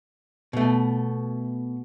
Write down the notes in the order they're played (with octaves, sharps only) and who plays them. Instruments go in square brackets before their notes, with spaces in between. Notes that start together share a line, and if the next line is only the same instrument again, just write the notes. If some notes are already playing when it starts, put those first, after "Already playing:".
[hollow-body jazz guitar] B2 A3